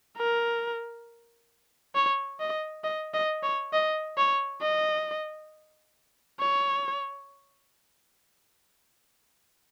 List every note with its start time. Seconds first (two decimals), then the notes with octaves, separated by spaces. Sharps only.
0.17 A#4
1.95 C#5
2.40 D#5
2.84 D#5
3.14 D#5
3.43 C#5
3.73 D#5
4.17 C#5
4.61 D#5
6.40 C#5